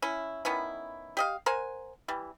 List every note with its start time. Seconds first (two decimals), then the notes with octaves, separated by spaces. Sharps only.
0.02 C#4 E4
0.45 D#3 B3 C#4 E4
1.17 G4 D#5 F5
1.46 A#4 C5 F#5 G#5
2.08 E3 G3